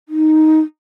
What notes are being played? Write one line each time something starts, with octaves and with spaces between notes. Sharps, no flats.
D#4